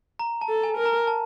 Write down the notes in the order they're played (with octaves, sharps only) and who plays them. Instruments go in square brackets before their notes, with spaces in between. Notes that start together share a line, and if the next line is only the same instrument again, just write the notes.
[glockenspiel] A#5
A5
[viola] A4
[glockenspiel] G#5
[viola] A#4
[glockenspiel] A#5
A5